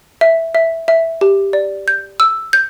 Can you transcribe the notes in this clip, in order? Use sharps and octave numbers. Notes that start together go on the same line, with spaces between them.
E5
E5
E5
G4
D5
G6
E6
G6